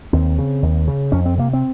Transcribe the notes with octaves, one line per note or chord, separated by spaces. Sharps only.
D#2 C4
C#3
D#2
C#3
F2 C#4
C4
C3 A#3
C4